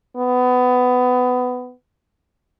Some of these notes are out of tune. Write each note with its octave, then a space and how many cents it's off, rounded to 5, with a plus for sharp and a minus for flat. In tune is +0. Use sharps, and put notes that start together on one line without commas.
B3 +20